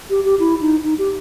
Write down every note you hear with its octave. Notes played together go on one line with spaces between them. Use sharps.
G4
G4
E4
D#4
D#4
G4